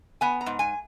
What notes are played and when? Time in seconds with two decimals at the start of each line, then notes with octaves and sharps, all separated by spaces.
0.21 B3 G#5
0.41 A#5
0.46 G#2
0.59 G#5